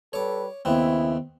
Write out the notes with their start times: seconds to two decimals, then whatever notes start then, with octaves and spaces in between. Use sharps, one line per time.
0.13 G3 A4 B4 C#5 D6
0.65 D#2 C#3 B3 C4 E4